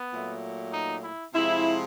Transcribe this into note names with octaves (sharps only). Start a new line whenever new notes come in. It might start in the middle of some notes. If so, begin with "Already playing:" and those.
Already playing: B3
A#2 F#3 A3
D#4
E4
C3 F3 G#3 E4